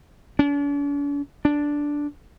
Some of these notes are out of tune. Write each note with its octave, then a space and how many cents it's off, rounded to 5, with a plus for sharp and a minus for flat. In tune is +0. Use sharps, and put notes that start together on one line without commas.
D4 -45
D4 -5